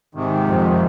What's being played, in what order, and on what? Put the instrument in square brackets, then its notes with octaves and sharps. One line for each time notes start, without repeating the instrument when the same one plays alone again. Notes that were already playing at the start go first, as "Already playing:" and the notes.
[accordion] G#2 C3 D#3
[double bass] F2